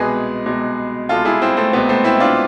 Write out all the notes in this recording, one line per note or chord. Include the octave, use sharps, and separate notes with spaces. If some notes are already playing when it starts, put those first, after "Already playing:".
Already playing: C2 B2 G#3 G#4 B4
C2 B2 G#3
C2 B2 G#3 F4 A4
E4 G#4
C4 E4
A3 C4
C2 B2 G#3 B3
A3 C4
C4 E4
D4 F4